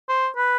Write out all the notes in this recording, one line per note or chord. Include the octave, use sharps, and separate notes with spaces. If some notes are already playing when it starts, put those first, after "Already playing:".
C5
B4